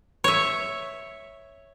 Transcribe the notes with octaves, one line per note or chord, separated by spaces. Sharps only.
C#5 E5